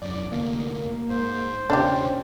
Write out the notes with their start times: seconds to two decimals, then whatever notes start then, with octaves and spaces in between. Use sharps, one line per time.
0.02 E1 F#2 D5
0.32 F1 D2 A#3
1.09 G#2 C5
1.70 E1 A#2 C#3 C#4 D4 G4